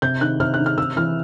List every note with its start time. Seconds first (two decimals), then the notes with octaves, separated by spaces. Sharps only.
0.02 C3 G6
0.21 D#3 F#6
0.40 C3 F6
0.54 F#6
0.59 D#3
0.66 F6
0.78 C3 E6
0.96 E3 F6